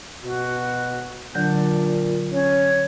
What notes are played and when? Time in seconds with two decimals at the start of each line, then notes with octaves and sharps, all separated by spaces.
0.23 B2 F#4
1.35 A#2 D3 F#3 D4 G6
2.32 C#4 C#5